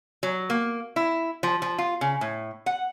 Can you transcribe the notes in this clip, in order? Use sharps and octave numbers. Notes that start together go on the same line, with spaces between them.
F#3
A#3
E4
F3
F3
F4
C#3
A2
F#5